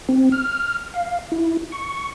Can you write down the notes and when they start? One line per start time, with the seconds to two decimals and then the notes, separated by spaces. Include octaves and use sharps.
0.09 C4
0.32 F6
0.94 F5
1.32 E4
1.72 C#6